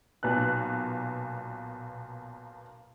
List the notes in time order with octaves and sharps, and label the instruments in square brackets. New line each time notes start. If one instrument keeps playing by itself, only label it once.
[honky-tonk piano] B1 A#2 B3 F#6